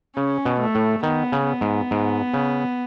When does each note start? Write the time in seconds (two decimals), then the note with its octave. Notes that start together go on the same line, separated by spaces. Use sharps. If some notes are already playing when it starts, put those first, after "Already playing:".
0.16 C#3 C#4
0.45 B2
0.60 A3
0.75 A2
1.03 D#3 B3
1.32 C#3
1.47 B3
1.61 G#2
1.91 G#2
2.34 C#3